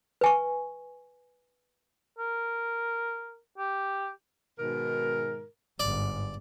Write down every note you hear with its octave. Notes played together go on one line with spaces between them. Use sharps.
B4 G#5 C#6
A#4
G4
G#2 B2 D#3 A#4
G1 G#2 D5